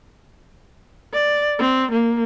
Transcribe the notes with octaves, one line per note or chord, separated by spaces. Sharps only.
D5
C4
A#3